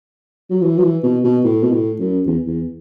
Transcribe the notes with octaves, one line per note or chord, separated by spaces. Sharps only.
F#3
E3
F#3
E3
B2
B2
A2
B2
A2
F#2
E2
E2